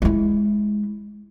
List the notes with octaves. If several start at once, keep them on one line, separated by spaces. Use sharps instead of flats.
G#3 E4